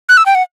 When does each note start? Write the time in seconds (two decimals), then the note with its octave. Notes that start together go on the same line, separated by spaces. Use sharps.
0.09 F#6
0.17 E6
0.26 G5
0.35 F#5